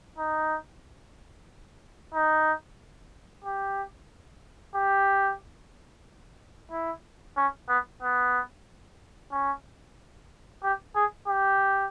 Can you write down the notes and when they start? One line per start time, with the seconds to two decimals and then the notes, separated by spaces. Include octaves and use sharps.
0.18 D#4
2.14 D#4
3.45 G4
4.75 G4
6.71 E4
7.37 C#4
7.69 B3
8.02 B3
9.32 C#4
10.63 G4
10.95 G#4
11.28 G4